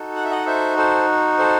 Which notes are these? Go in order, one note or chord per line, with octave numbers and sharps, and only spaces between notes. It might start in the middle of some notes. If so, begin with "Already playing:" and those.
Already playing: D#4 F#4 A4
F#5
E5
D#5 F#5
C5 E5
A4 C5
A4 C5